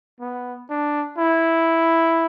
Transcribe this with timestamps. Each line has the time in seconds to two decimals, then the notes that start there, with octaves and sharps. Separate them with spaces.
0.20 B3
0.70 D4
1.18 E4